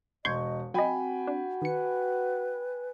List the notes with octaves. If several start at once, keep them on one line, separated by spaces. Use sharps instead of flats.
E1 D#5 C6 C#6 G6 G#6
F#3 C4 F#4 D#5 G5 G#5 B5
D4
D#3 B4 C#7